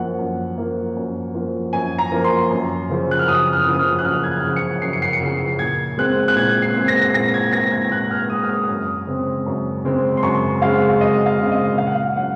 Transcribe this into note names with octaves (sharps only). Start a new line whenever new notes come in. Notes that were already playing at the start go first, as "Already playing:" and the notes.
Already playing: F#2 F3 A#3 F#5
F#2
F3 A#3
F#2
F3 A#3
F#2 G#5
A#5
F3 A#3
C6
F#2
C#3 F3
F#6
F6
F#2 D#6
F6
C#3 F3
D#6
F6
F#6
F#2 F6
G#6
F#6
C#3 F3
C#7
F#2 C7
C#7
C7
C#7
C#3 F3 C7
A#2 G#6
G#3 C4 F#6
F#6
A#2 G#6
C7
G#3 C4
A#6
A#2 A#6
G#6
G#3 C4 A#6
G#6
A#2 F#6
F6
G#3 C4 D#6
F6
D#6
F#2
C#3 G#3 C4
F#2
C#3 G#3 C4
C6
F#2 C#6
C#3 G#3 C4 F5
F#2 D#5
F5
C#3 G#3 C4
D#5
A#2 F5
F#5
F5
F#3 C#4 F#5